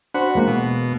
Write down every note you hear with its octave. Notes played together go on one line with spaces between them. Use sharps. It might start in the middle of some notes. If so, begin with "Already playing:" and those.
D4 F#4 C5 F#5 B5
E2 G#3 A#3
B2